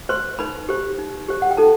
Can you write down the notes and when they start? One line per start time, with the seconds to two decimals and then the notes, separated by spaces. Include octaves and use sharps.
0.09 B4 C5 C6
0.39 D#4 B4 B5
0.69 G4 C5
0.99 D#4
1.29 G4 C5
1.42 F#5
1.51 G5
1.57 D#4 A4 A5